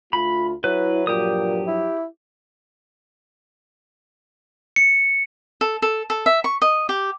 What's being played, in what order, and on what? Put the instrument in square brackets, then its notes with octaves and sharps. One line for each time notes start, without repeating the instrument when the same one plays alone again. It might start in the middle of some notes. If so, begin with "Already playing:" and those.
[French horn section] D2 A3 F4 [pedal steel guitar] B5
[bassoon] F#3 [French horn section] E4 [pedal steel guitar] B4
[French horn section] G2 F3 F#3 [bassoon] A#2 [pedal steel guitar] G4 D#6
[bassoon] E4
[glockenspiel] C#7
[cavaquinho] A4
A4
A4
E5
C#6
D#5
G4